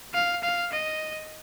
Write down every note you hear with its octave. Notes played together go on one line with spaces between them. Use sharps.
F5
F5
D#5